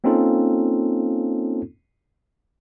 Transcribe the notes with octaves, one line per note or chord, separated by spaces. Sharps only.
A#3 C4 C#4 D#4 F4 A4